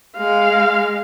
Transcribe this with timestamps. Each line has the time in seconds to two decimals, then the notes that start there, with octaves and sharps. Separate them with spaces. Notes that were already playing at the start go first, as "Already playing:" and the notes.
0.17 G#3 F5